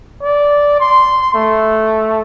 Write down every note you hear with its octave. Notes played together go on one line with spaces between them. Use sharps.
D5
C6
A3